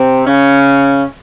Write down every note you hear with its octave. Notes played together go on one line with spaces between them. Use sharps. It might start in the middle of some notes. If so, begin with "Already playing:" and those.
Already playing: C3 C4
C#3 C#4